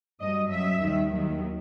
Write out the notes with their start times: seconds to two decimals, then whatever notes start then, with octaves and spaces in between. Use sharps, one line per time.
0.20 G2 F#3 D#5
0.50 F#2 F#3 E5
0.81 D#2 D#3 G3
1.11 D#2 D#3 F#3